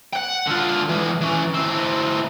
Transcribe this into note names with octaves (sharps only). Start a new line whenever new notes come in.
F#5 G5
D3 F4
E3 G#3
E3 C#4
A2 C4